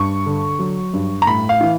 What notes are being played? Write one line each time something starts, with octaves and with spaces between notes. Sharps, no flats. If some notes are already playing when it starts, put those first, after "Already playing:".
Already playing: G2 C#6
D3
F#3
G2
A#5
A2 B5
F5
E3